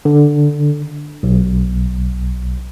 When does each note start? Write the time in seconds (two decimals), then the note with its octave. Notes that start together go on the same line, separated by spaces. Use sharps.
0.05 D3
1.23 B1